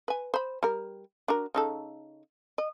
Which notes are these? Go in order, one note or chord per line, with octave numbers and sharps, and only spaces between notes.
B4 G#5
C5 B5
G3 A#4
D4 F#4 A#4
C#3 D#4 A4
D#5